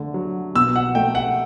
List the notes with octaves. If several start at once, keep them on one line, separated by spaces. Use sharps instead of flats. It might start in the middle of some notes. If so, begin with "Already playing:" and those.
Already playing: D3 A3
F#3
B2 E6
F#5
A3 G5
F#5